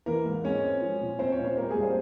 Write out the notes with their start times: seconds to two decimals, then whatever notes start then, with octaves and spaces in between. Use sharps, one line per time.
0.06 E3 A#3 A#4
0.26 G#2
0.44 G#3 C#4 C#5
0.63 C4
0.81 F3
1.00 A#2
1.19 C4 C5
1.32 C#4 C#5
1.39 A#2
1.45 C4 C5
1.57 G3 A#3 A#4
1.70 G#3 G#4
1.76 G2
1.82 C4 C5